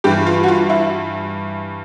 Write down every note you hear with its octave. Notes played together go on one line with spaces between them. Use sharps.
G2 E3 G4
F4
F#4
F4
E4